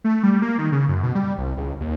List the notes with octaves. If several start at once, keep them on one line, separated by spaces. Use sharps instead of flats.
A3
G3
A#3
D#3
C#3
F#2
B2
G3
C2
C#2
D#2